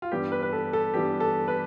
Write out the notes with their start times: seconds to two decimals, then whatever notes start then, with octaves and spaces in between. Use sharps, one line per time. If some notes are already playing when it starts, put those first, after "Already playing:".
0.02 F4
0.12 G2 E3 G3 B3 G4
0.32 B4
0.42 B4
0.52 A4
0.73 A4
0.94 G2 E3 G3 B3 G4
1.20 A4
1.48 B4